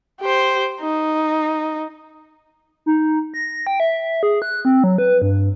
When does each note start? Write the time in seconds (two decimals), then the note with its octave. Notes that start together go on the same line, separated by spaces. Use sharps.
0.20 G4 C5
0.81 D#4
2.86 D#4
3.34 A#6
3.67 G5
3.80 E5
4.23 G#4
4.42 F#6
4.65 C4
4.84 F#3
4.98 B4
5.22 G2